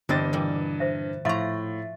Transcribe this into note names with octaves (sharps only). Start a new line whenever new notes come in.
G2 D3 E3 C4 D4 D#5 A6
A#2 E3 G3
C5 E5
A2 F3 E5 F5 A#5 C6 C#6 A6